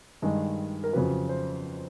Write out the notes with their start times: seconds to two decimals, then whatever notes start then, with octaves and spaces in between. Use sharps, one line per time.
0.22 G2 D#3 G#3
0.84 A#4
0.93 F2 C#3 F#3 B4
1.29 C5